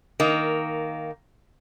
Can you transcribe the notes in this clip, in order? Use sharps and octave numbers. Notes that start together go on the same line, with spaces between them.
D#3 A#3